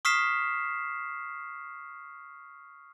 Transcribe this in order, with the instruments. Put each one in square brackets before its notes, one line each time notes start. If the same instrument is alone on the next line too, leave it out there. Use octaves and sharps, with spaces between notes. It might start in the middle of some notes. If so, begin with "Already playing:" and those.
[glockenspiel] C#6 D#6 F6 B6 C7 E7